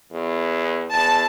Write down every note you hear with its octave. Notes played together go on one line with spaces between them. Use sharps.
E2
E2 A5